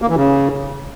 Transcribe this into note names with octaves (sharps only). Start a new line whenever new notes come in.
A#3
E3
C#3